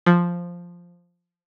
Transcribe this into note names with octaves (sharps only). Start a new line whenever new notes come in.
F3